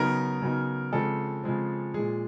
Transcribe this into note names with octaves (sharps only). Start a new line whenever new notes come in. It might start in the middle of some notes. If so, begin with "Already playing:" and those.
Already playing: C#3 F#3 B3 D#4 A#4
C#3 F#3 B3 D#4
C#3 F3 G#3 C4 A4
C#3 F3 G#3 C4
A#2 F3 G#3 G#4